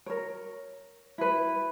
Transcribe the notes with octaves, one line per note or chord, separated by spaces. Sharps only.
A#4 C#5
E4 B4